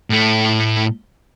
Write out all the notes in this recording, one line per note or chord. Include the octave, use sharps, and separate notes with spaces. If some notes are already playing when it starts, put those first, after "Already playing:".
A2 A3